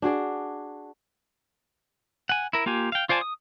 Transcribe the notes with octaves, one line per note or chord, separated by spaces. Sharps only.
D4 F#4 G#4 D5
F#5 G#5
E4 A#4
A#3 F4 G4 G#5
F5 G5
F4 C5 D5 G#5 A5
D#6